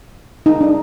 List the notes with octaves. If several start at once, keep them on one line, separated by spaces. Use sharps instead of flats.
D#4
D4